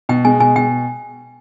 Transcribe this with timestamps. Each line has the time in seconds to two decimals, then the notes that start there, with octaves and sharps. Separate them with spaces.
0.09 B2 G5
0.25 G#3 G#5
0.40 B2 G#5
0.56 B2 G5